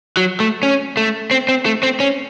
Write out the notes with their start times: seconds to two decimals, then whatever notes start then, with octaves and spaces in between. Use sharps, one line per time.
0.17 F#3
0.40 A3
0.63 C#4
0.97 A3
1.31 C4
1.49 C4
1.66 A3
1.83 C4
2.00 C#4